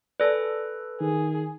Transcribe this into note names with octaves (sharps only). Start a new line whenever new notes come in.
A4 B4 D5 G#5 A5
D#3 G#4